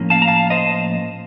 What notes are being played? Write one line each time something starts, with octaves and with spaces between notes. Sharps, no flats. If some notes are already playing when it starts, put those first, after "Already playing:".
Already playing: A2 F3 A#3 C#4
F5 A5
A#5
F5 A5
C5 D#5